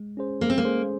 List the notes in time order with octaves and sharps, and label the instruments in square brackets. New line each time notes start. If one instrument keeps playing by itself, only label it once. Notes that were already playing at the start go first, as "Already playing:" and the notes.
Already playing: [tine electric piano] G#3
C#4 G#4 C5
[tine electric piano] G#3 [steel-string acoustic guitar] A#3
[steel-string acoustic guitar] C4
A#3
[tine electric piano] C#4 G#4 C5